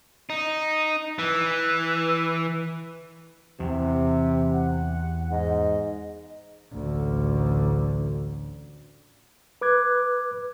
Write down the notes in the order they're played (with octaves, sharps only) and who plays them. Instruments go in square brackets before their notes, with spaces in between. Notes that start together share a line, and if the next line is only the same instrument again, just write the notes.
[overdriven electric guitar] D#4
E3
[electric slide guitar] E2 E3 [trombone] C3
[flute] F#5
[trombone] G#2 [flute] D#5
[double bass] A1 D2
[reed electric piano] B4 D6 F#6 G#6